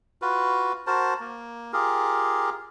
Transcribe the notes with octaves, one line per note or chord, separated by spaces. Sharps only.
F4 F#4 B4
F#4 A#4 C5 A5
A#3
F4 G4 G#4 A#4